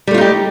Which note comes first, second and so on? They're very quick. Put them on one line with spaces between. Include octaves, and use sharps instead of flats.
G3 A3 F4 D#4 G4